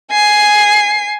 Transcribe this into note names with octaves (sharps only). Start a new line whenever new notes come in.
G#5 C7